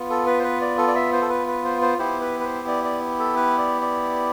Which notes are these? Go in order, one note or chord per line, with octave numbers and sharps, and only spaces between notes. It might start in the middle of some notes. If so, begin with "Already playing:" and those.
Already playing: B3 F4
A4
B4
C5
B4
D5
A4
D5
E5
C5
A4
B4
B4
C5
C5
B3 E4 G4 C5
B4
B4
C5
D5
D5
A4
B4
D5
D5